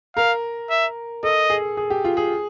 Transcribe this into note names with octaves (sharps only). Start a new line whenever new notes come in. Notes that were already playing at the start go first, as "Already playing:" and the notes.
A#4 F5
E5
A4 D#5
G#4
G#4
G4
F4
G#4